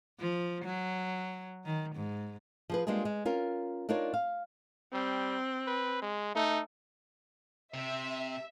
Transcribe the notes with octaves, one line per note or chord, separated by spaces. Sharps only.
F3
F#3
D#3
G#2
F3 G#4 B4
G3 G#3 A#3 D4 F4 G#4
G#3
C#4 F4 A#4
D4 D#4 F4 A#4 C#5
F5
G3 C4
B4
G#3
A3 D#4
C3 E5